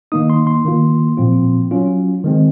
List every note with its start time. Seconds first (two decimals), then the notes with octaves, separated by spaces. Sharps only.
0.12 D#3 A#3 D#4 D#6
0.30 C6
0.47 C6
0.65 D#3 A#3 F4
1.17 A#2 F3 C4 F4
1.71 F#3 C#4 F4
2.24 D#3 G#3 C4